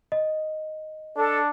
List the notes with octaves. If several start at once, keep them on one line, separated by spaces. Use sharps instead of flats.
D#5
D4 A4